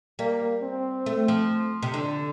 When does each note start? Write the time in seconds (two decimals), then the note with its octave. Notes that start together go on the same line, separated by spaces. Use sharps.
0.19 G3 A#3
0.63 C4
1.06 A3
1.28 F3
1.83 C3
1.94 D3 D4